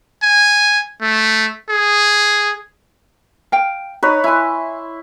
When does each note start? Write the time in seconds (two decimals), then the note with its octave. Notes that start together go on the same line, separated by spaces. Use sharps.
0.23 G#5
1.01 A3
1.69 G#4
3.52 F5 G5
4.03 D#4 B4 C#5 D#5
4.24 E4 E5 G#5 C6